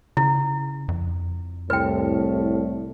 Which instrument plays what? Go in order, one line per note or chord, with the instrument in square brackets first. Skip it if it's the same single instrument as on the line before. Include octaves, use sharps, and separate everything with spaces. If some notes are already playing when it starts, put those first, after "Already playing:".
[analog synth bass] C#3 [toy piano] E4
[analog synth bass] F2
[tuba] C2 [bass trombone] A2 [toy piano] B4 G5